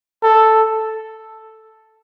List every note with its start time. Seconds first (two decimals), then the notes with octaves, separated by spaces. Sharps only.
0.23 A4